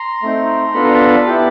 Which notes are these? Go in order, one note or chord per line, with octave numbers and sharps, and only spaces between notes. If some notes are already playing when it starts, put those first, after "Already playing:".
Already playing: A#5 C6
A3 C4 D#4
B3 D4 F4 A4 B5
A#5
A5 B5
B3 E4 G4